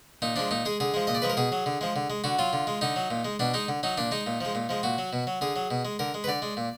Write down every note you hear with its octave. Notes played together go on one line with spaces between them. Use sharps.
A#2 D#4
F3 G#3 D4
A#2 D#4
G#3 G#4
D3 G#4
F3 G#3
A#2 D#5
D5
F3 G#3 B4
A#4
B2 G#4
F#3
D3
F3 G#3
D3
G#3
D3 F#4
F#3 F4
D3
G#3
D3 D#4
F#3
A#2
G#3
B2 D4
G#3 D#4
D3
F#3 D#4
A#2 D4
G#3 D#4
A#2
F3 G#3
A#2
F3 G#3
A#2 F#4
F#3
B2
F#3
D3 G#4
F#3
B2
G#3
D3 A#4
G#3
B4
D3 D5
G#3
A#2